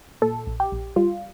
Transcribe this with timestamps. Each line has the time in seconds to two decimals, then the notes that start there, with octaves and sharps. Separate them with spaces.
0.22 A#2 A4
0.47 A#1
0.60 G4
0.72 A#1
0.96 G3 F4